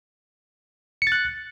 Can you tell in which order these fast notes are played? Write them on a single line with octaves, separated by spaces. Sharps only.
C#7 A6 F#6